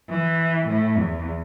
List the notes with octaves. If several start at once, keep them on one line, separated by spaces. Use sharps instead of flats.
E3
A2
E2